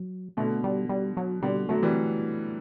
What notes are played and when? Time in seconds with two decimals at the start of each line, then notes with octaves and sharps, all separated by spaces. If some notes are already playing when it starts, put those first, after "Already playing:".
Already playing: F#3
0.37 B2 D3 A3
0.64 G3
0.89 G3
1.17 F#3
1.42 B2 D3 G3
1.69 D3 F#3 A3
1.83 E3 G3